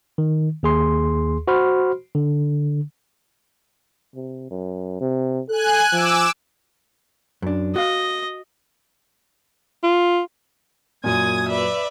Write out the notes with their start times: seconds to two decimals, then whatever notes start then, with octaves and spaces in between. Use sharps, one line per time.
0.18 D#3
0.63 D#2 G#4 C6
1.48 F#4 C5 B5 C6 F6
2.15 D3
4.15 C3
4.50 F#2
5.00 C3
5.49 A4 G#5 F#6
5.92 F3 D6 E6
7.42 F#2 D4
7.76 F#4 D#5 F5
9.84 F4
11.04 F#2 A#2 G#5 D#6 G#6
11.48 B4 D5 E5